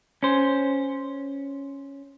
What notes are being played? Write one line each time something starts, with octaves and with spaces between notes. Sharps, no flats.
C#4 C5